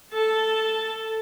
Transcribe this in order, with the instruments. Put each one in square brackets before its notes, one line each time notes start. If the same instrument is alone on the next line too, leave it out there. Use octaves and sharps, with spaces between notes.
[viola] A4 A5